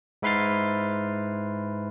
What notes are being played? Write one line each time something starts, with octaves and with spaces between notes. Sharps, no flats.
G#2 E4 B4 C6 F6 A6